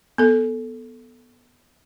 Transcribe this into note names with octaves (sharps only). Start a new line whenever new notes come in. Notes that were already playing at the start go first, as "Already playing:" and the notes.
B3 A4